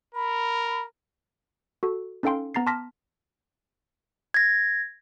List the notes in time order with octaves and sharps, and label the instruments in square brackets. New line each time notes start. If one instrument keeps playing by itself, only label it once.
[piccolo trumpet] A#4 [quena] B5
[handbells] F#4 A4
C#4 D#4 A4 F5 G5 C6
B3 A#5 A6 C7
A5 C6 D6 F6 A#6 B6
[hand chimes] G#6 A#6